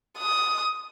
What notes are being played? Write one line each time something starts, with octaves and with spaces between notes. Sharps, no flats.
D#6